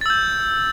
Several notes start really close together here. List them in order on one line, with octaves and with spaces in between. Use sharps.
A6 E6 G6